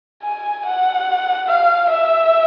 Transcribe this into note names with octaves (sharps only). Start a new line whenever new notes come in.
G#5
F#5
F5
E5